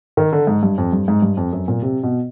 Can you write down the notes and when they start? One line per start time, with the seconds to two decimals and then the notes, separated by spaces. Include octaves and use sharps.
0.17 D#3
0.32 D3
0.47 G#2
0.63 G2
0.78 F2
0.92 G2
1.08 G#2
1.22 G2
1.37 F2
1.53 F#2
1.68 A#2
1.82 C3
2.03 B2